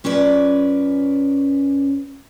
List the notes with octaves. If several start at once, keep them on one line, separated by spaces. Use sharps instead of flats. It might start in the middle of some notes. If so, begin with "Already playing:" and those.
F#2 C#4 F4 B4 D5